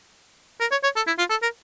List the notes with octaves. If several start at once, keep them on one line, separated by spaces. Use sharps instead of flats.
A#4
C#5
C#5
A4
E4
F4
A4
A#4